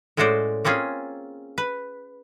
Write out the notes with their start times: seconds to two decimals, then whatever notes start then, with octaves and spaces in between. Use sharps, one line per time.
0.17 A2 G#3 C#4 F#4 C5 D5
0.65 A#3 C4 C#4 F4 G#4
1.58 B4